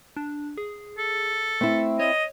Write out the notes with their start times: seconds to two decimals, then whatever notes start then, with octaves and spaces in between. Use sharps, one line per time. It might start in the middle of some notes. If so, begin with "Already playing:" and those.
0.17 D4
0.58 G#4
0.98 A4
1.61 A3 C4 E4
2.00 C#5 D#5